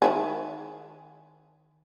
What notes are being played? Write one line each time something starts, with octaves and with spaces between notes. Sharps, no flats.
D#3 E4 G#4